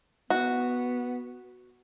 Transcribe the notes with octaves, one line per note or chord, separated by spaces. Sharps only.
B3 F#4